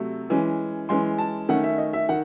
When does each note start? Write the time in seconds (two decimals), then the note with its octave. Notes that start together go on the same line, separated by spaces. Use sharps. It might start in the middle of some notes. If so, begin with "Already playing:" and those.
Already playing: C3 F#3 A3
0.30 E3 G#3 C#4
0.89 E3 G#3 C#4 C6
1.18 A5
1.49 D#3 A3 C#4 F#5
1.64 E5
1.78 D#5
1.93 E5
2.09 D#3 F#5